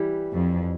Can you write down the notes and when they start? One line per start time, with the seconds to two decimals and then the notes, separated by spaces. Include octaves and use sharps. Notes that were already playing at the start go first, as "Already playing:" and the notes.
Already playing: E3 G3 G4
0.33 F2